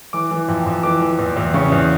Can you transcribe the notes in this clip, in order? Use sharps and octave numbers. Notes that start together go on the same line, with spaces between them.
E3 D6
E3
F2
F2
E3 D6
E3
E2
E2
C#3 C#6
E2